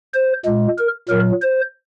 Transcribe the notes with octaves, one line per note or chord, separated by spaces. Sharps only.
C5
A#2 G#3
A#4
A#2 F#3 A#4
C5